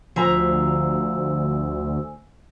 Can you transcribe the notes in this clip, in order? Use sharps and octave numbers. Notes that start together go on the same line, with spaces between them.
D2 F3 C5 G#5 A#5 E6